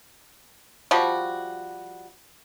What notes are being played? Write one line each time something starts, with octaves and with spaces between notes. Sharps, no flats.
F3 G3 F#4